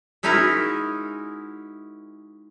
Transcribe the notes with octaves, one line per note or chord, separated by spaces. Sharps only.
G#3 C#4 D#4 E4 F#4 A#4